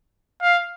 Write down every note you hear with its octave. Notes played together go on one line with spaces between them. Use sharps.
F5